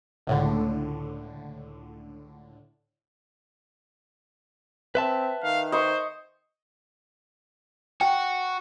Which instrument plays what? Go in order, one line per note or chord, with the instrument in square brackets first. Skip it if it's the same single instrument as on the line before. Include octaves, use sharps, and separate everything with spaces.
[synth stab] C#2 A2 D3
[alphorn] C4 [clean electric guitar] B4 E5 A5
[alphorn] D#3 [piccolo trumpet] F5
[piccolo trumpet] C5 [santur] D#5 C#6
[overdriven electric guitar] F#4 [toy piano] G5